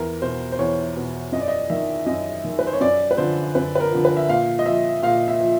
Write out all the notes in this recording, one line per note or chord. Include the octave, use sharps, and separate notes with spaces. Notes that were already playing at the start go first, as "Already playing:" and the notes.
Already playing: E2 A#4
B2 C5
C5
E2 C#5
B2
F#2 D#5
D5
D#5
D#3 E5
F#2 D#5
D#3
B4
C5
C#5
F#2 D5
B4
D3 F3 C5
F#2 B4
B4
A#4
D3 F3
B4
E5
A#2 F5
D#5
F3 E5
A#2 F5
E5
F3